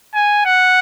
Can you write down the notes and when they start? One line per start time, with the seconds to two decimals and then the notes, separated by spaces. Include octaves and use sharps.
0.15 G#5
0.46 F#5